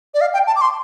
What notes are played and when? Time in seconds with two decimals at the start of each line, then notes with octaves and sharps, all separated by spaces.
0.14 D5
0.21 F5
0.34 G5
0.47 A5
0.56 D6
0.61 C6